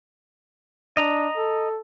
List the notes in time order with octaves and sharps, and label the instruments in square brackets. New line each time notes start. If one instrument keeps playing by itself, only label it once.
[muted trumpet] D4 [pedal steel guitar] D#5 A#5
[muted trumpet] A4